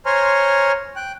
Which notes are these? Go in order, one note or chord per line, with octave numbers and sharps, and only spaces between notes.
C5 C#5 G#5 A#5 C6 F6
G5 F#6